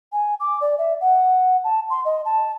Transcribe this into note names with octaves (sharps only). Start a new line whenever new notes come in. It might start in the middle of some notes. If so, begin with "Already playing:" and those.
G#5
D6
D5
E5
F#5
A5
C6
D#5
A5